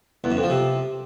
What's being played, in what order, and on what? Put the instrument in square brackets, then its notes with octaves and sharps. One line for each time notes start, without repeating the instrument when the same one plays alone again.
[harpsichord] E2
F#2
F2
F3
C3